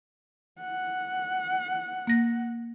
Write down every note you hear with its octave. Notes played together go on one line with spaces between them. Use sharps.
F#5
A#3 A#6